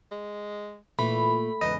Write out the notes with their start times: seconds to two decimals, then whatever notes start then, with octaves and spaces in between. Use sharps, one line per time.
0.11 G#3
0.99 A#2 E3 A3 B5
1.61 E2 G#2 C#3 B4 D#5